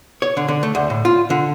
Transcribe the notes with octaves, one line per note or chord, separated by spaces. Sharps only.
C#5
D3
D3
A3
D2
A2
F4
D3